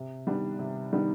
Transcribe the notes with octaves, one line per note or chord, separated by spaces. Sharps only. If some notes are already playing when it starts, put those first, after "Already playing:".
Already playing: C3
D#3 G3 B3 D4
C3
D#3 G3 B3 D4